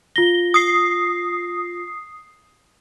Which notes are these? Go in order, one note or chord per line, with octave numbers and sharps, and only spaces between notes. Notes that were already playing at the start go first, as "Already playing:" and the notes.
F4 A#6 G7
D#6 C7